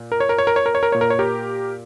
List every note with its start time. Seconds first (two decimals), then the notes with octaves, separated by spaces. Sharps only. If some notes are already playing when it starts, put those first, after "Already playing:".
Already playing: A#2
0.12 A#4
0.20 C#5
0.29 A#4
0.38 C#5
0.47 A#4
0.56 C#5
0.66 A#4
0.75 C#5
0.83 A#4
0.92 A#2 C#5
1.01 A#4
1.10 C#5
1.19 G4 A#4